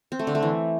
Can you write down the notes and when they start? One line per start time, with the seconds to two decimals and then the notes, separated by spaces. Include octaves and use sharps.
0.12 C4
0.19 A3
0.27 D3
0.35 A3
0.43 E3